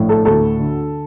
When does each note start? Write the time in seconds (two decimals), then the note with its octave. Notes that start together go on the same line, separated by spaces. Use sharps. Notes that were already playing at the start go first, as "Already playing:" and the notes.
Already playing: A#1 A2
0.09 A4
0.25 D2 A4
0.58 D3